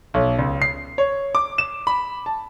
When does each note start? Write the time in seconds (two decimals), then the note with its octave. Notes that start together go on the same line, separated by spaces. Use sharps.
0.14 B1
0.39 C#2
0.62 C7
0.98 C#5
1.35 D6
1.58 E7
1.87 B5
2.26 A5